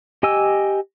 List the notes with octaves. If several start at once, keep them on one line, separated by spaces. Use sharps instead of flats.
G4 D#5 G#5 E6